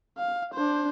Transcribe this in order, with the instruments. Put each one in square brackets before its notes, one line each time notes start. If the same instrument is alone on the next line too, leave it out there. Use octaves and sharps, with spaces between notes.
[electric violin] F5
D4 C5